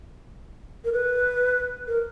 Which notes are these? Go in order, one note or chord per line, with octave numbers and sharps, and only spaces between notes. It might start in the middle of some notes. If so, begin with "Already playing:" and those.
A#4
B4
A#4